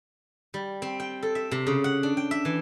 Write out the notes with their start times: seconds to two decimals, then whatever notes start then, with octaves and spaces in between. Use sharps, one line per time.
0.54 G3
0.82 C4
1.00 G5
1.23 A4
1.35 E5
1.51 C3
1.67 C#3
1.84 F#5
2.03 D4
2.17 G5
2.31 E5
2.45 E3